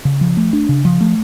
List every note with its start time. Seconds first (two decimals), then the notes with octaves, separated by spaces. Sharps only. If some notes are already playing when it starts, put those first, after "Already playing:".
0.05 C#3
0.21 F3
0.37 A3
0.53 D4
0.69 C#3
0.85 F3
1.01 A3